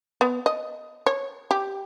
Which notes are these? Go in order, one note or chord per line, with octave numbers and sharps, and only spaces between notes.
B3
D#5
C#5
G4